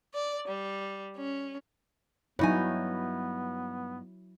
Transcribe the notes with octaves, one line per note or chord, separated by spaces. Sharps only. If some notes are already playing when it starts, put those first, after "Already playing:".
D5
G3
C#4
G2 F#3 B3 D#4 E4 C#5 G#5